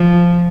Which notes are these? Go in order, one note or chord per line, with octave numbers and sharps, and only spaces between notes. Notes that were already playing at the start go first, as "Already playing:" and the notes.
Already playing: F3